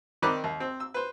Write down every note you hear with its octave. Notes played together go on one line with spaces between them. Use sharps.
D#3 C4 D5 B5 F#6
D#2
C4
E6
B4 C5